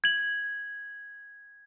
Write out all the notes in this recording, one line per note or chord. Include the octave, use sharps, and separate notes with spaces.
G#6 F#7